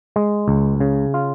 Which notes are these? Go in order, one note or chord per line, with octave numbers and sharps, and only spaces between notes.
G#3
C#2
C#3
F4